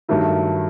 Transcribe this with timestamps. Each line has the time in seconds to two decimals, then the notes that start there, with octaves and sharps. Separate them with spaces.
0.09 G2 D#3 F#3 A3 E4